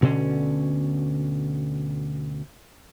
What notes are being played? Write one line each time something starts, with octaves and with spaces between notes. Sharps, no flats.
D2 B2 D3 C#4